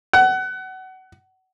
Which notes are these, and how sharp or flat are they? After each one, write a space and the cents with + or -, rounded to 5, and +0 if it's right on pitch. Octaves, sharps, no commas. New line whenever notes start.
F#5 +25